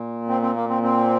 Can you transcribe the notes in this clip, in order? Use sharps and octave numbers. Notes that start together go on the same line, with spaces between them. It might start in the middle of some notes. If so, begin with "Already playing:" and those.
Already playing: A#2
C4
C4
A#3
C4
C4